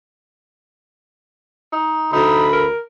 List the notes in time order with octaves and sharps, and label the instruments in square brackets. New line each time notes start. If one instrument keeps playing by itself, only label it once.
[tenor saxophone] D#4
[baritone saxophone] D2 [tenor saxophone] D#4 [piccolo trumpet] B5
[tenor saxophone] A#4